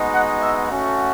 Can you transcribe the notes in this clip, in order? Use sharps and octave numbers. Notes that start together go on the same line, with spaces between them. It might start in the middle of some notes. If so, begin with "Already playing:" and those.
Already playing: G#3 B3 D#4 F#4
F#5
E5
A3 C#4 F#4